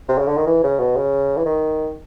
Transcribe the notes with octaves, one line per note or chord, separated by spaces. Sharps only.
C3
C#3
D3
D#3
E3
C#3
B2
C#3
E3
D#3